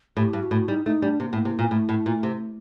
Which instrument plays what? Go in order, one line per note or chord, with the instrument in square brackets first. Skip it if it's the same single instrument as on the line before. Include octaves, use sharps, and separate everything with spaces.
[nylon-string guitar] A2 [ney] G4
[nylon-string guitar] G2
[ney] F#4
[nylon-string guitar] A2
[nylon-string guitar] G3 [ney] D#4
[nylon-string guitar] A3 [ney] D#4
[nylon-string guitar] G3 [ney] D4
[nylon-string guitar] C3 [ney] A#3
[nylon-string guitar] A2
C3
A#2
[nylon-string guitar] A2 [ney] A3
[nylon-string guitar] A2
A#2
C3